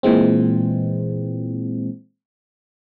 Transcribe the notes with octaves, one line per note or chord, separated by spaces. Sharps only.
A#2 E3 G#3 C4